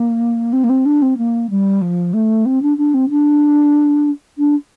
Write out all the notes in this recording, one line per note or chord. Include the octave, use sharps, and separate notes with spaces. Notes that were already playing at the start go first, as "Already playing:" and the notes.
Already playing: A#3
C4
A#3
C4
D4
C4
A#3
G3
F3
A3
C4
D4
D4
C4
D4
D4